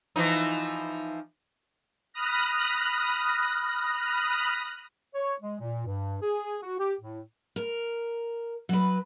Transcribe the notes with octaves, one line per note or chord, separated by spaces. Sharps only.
E3 F3 D#4
B5 D#6 F6 F#6 A#6
C#5
G#3
A#2
G2
G#4
F#4
G4
A2
A#4
F#3 B4